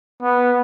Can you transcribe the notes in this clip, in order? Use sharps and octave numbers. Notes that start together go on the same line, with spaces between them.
B3